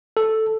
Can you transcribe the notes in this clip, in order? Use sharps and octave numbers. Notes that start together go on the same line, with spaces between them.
A4